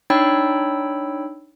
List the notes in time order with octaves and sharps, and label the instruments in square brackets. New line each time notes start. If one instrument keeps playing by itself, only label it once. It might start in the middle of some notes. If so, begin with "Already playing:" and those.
[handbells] D4 D#4 C#5 G5 B5 E6